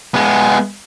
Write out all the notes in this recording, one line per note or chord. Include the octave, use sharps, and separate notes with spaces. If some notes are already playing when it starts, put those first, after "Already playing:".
G#3 B3